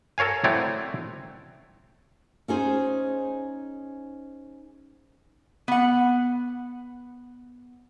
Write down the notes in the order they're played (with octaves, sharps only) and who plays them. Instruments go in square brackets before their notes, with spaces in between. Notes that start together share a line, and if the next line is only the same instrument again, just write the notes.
[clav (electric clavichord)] A4 A#4 C#5 F5 G#5
F#3 A3 C4 E4 C#5 D5
[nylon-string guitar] C#4 D#4 G#4 C5
[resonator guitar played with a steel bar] B3 F#5